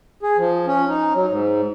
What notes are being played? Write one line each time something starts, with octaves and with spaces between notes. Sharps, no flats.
G#4
F3
C#4
D#4
F#3
G#2